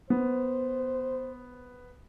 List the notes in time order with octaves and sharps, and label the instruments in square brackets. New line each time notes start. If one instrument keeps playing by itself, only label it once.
[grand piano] B3 [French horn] C5